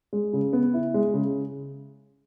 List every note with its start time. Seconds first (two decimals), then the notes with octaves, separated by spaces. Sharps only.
0.13 G#3
0.33 C#3
0.53 B3
0.74 E4
0.94 G#3
1.14 C#3